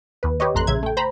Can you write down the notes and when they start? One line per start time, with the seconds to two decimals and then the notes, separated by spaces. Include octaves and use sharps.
0.23 D#2 B4
0.40 G4 B4 C#5 D#5
0.54 A1 F2 A3 A#5 C6 F#6
0.67 A#1 C#3 E5 G#6
0.83 A3 G5
0.97 C5 A#5 B5